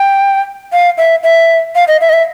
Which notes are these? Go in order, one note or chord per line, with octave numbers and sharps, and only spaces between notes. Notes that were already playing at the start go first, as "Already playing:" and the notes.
Already playing: G5
F5
E5
E5
F5
D#5
E5
D#5
E5